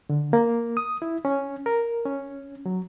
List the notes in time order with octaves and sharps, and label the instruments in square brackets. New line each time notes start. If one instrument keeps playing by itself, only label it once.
[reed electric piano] D3
A#3
D#6
E4
C#4
A#4
C#4
F#3